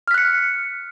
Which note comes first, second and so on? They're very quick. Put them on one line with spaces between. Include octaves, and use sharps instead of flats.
F6 B6 F#6 C#7